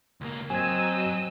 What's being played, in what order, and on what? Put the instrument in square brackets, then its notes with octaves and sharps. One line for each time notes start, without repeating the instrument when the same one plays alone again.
[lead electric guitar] C#2 A#3
[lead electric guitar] F#3 [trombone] C4 [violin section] D#5 D#6 E6 [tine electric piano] G#5 G#6